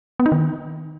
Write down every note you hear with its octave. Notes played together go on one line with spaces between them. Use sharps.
B3
D#4
D#3